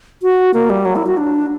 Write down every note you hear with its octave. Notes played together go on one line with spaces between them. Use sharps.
F#4
A#3
G3
F#3
E4
F#4
D4